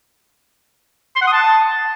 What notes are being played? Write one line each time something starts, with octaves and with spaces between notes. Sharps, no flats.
C6
F#5
D#6
A5